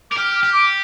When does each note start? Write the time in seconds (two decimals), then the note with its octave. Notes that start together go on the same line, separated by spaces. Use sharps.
0.11 A#4 D6
0.17 G4 F6
0.35 F6
0.43 G4
0.52 D6